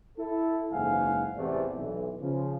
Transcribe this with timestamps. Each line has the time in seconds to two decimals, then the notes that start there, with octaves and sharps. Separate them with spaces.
0.19 E4 A4
0.72 F#1 G#2 E3 F5 F#5 G#5
1.37 A1 E2 C3 A3 D5
1.76 B1 E3
2.22 C#3 F3